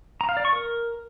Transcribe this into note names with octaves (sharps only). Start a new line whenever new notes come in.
A#5
F5
D5
C#6
A#4